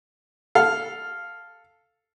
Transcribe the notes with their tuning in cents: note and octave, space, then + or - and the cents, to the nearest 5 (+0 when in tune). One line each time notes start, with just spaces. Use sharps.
A4 +0 F5 +0